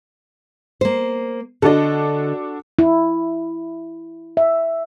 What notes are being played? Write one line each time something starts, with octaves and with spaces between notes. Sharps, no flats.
A#3 C5
D3 D4 F#4 A4 D#5
E4
E5